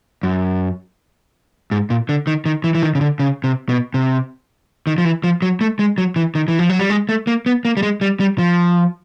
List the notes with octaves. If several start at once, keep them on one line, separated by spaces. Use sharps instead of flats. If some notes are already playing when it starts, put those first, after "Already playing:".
F#2
G#2
A#2
D3
D#3
D#3
E3
E3
D#3
C#3
D3
C#3
C3
B2
C3
D#3
F3
E3
F3
F#3
A3
G#3
F#3
E3
D#3
E3
F3
F#3
G3
G#3
A3
A#3
B3
A#3
G3
G#3
G3
G3
F3